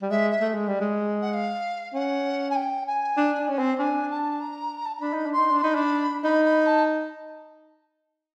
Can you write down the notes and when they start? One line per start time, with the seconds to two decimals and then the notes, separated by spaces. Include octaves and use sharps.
0.02 G3
0.10 G#3 E5
0.30 E5
0.41 A3
0.54 G#3
0.68 G3
0.81 G#3
1.22 F#5
1.33 F5
1.94 C#4 F#5
2.50 G#5
2.55 G5
2.86 G#5
3.17 D4
3.38 D4
3.48 C#4
3.59 C4
3.79 D4 G#5
4.10 A5
4.40 A#5
4.85 A5
4.93 A#5
5.01 D4 B5
5.13 D#4
5.26 D4
5.32 C6
5.38 D#4
5.51 D4
5.63 D#4 B5
5.75 D4
6.24 D#4 B5
6.44 B5
6.66 A5